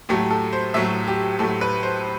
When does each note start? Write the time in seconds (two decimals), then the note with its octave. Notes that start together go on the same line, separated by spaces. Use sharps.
0.09 A2 F#3 A3 G4
0.31 A4
0.53 C5
0.74 A2 F#3 A3 E5
1.08 G4
1.39 A2 F#3 A3 A4
1.61 B4
1.83 C5